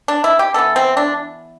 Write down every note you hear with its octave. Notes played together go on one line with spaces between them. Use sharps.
D4
E4
G4
E3 B3 A4
C4
D4